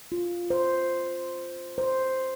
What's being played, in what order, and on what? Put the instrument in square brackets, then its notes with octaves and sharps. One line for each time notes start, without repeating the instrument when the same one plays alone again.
[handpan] F4
C5
C5